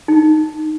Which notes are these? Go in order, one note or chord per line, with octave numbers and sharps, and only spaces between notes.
D#4